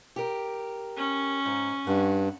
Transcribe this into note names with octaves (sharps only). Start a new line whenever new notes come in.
G4 A#4
C#4
G#2
G2 F#5